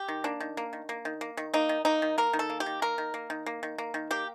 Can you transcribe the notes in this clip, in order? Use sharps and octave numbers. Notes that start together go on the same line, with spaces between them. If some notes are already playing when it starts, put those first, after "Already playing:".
Already playing: G4
D#3
A#3 D4
D#3
A#3
D#3
A#3
D#3
A#3
D#3
A#3 D#4
D#3
A#3 D#4
D#3
A#3 A#4
D#3
A4
A#3
G4
D#3
A#3 A#4
D#3
A#3
D#3
A#3
D#3
A#3
D#3
A#3 G4